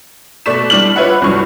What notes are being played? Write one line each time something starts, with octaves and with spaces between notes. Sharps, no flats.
B2 A3 D5 C#6 B6 E7
G3 D4 E4 F6 F#7
F4 B4 C#5 E5 F#5
C2 G2 F#3 E4 C#6 F6